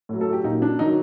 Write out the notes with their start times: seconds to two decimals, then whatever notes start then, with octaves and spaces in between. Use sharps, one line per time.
0.09 A2 F#3
0.21 A4
0.33 G4
0.44 A#2 F#3 D#4
0.62 D4
0.79 D#3 F#3 D#4